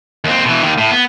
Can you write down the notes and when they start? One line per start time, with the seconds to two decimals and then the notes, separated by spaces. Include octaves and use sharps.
0.24 D#2 C4
0.45 B2 E3
0.63 D#2 D#3
0.78 A2
0.91 B3